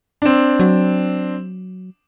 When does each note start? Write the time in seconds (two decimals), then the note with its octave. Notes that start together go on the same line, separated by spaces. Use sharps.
0.22 C4 D4
0.60 F#3